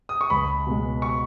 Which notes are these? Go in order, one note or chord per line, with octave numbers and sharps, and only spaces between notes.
D#6
C#6
C#2 B5
B2 G#3
C#6